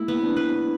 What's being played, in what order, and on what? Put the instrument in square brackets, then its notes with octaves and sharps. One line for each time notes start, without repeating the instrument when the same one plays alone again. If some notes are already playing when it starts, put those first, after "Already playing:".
Already playing: [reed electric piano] G#3 A#3 [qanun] E4
[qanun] B3
[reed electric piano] C4 D4
[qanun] B4